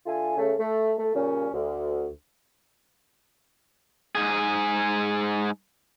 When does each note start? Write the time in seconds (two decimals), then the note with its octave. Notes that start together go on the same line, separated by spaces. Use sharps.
0.06 D3 F4 E5 G#5
0.37 C#3 A3
0.59 A3
0.99 A3
1.15 A#2 C#3 G3 C#4
1.54 D2
4.15 G#2 G#4